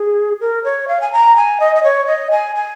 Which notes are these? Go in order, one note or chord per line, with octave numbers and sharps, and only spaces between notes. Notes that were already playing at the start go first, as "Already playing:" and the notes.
Already playing: G#4
A#4
C#5
F5
G#5
A#5
G#5
D#5
D#5
C#5
D#5
G#5
G#5